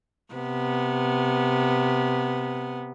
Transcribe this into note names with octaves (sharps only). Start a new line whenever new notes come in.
C3 B3